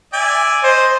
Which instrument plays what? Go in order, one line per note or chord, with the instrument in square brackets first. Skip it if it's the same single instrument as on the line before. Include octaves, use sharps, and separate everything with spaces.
[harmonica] D5 E5 G#5
[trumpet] C5 [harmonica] D#5